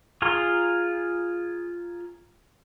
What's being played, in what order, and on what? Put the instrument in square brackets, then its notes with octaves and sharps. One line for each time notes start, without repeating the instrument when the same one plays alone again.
[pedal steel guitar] F4 G#4 A#5 C6